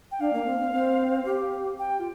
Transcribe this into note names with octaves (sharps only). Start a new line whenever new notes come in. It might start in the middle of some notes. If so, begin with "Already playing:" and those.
G5
D4 F5
A#3
C4
C4
C4
G4
G5
F4